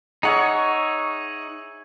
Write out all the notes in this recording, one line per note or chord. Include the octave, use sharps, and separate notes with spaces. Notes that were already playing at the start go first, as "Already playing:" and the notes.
D#4 G#4 C#5 E5 F#5